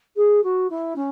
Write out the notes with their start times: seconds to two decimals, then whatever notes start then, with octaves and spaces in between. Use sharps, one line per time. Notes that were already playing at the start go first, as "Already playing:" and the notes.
0.16 G#4
0.43 F#4
0.69 E4
0.96 C#4